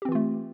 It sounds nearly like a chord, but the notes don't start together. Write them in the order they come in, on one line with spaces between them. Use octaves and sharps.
G4 C4 E3 F4 A3